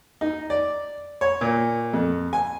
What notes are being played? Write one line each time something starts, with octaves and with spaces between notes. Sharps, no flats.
D#4
D5
C#5
A#2
F2
G#5